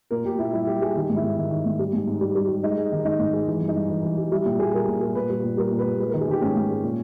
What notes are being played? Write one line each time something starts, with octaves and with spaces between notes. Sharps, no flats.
A#2 A#4
A#2 G4
A#2 E4
G3 E4
G3 G4
G3 G#4
D#3 G4
G#2
E4
G#2
D#3
D#3
G#2
G3
G#2
G#2
G3
G3
G3
G#3 D#4
G#3
D#3
G#3 D#4
G#2
G#3
E3
G2
D#4
G2
E3
E3
G3
G3 E4
A#2 G4
A#2 G#4
G3 A#4
A#2
G3 A#4
A#2 B4
G3
A#2
G3 A#4
A#2
B4
A#2
G#3 B4
D#3 A#4
G#4
D#3 G4
G#2 C#4
G#2
G#3
A#2